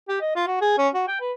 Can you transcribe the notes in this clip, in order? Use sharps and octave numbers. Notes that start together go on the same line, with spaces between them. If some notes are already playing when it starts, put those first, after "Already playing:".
G4
D#5
F4
F#4
G#4
C#4
F#4
G5
B4